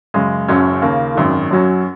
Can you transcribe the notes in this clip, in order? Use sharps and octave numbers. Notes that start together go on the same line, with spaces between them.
F#2 C#3 G#3
F#1 F#2 F#3 C#4
D#2 C#3 A#3
G#1 F#2 D#3
F#2 F#3 C#4